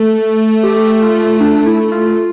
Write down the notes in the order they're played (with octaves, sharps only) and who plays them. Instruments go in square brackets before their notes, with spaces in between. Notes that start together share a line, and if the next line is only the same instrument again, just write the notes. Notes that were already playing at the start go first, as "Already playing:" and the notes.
Already playing: [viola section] A3
[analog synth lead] G4
F4
D4
E4
F4